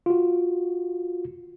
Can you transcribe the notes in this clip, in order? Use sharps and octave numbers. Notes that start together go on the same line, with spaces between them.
F4 F#4